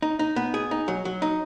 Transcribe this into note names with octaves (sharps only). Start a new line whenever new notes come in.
D#4
D#4
B3
G#4
D#4
F#3
F#3
D#4